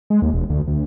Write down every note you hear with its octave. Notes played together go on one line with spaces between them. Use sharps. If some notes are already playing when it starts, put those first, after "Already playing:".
G#3
D#2
E1
D2
D2